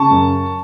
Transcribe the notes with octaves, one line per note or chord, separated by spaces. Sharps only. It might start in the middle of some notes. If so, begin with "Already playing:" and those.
Already playing: C#3 A5 C#6
F#2